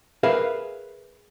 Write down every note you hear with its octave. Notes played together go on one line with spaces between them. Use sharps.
G#4 A#4 B4 E5 F5